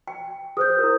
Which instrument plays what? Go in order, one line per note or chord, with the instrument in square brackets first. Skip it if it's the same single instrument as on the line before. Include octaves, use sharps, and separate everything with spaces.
[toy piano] G5
[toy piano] G#4 B4 C5 [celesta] D#6 G6
[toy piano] E4 A#4